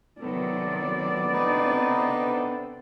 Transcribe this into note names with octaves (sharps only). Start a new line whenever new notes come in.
C3 D#3 F#3 B3 A4 D5
C3 C4 D4 D#4 B4